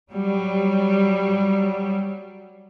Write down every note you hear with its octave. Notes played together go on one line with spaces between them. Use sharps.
F#3 G3